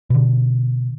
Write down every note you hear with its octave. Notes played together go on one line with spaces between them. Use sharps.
B2 D3